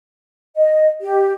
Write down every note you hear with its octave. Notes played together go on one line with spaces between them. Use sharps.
D#5
G4